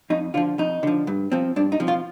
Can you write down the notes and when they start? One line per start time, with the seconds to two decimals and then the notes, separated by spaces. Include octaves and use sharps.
0.10 F2 D#4
0.34 D3 F3 F4
0.58 F2 D#4
0.83 D3 F3
1.07 G2
1.32 F3 C4
1.56 G2 D4
1.72 D#4
1.80 F3 C4
1.88 F4